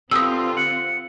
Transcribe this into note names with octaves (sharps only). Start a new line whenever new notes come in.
D3 C4 F4 G4 B4 D#6 E6
F#5